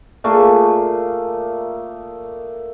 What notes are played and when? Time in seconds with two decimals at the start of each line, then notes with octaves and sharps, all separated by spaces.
0.24 A#2 A3 A#3 G#4